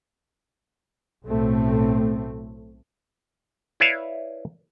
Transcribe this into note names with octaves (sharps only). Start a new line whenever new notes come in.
B1 A2 A3 C4
E4 B4 C#5 D5 E5 F5